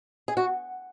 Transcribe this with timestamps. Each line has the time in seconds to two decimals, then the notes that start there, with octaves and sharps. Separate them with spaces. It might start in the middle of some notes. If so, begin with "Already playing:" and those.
0.28 G#4
0.37 F#4